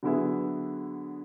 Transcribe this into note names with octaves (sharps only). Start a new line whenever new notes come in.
D3 F#3 B3 E4 G#4